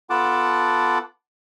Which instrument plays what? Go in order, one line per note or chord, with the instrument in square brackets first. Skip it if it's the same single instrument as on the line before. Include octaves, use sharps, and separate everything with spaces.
[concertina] B3 F4 A4 F#5 A5 D6